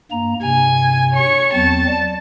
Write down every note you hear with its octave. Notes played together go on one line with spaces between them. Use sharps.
G2 A#3 A#5
G2 C3 G#5
C#5 C#6
E2 F#3 C4 A5
D5